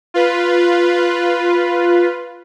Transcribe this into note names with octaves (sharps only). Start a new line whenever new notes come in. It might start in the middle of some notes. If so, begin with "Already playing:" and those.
F4 B4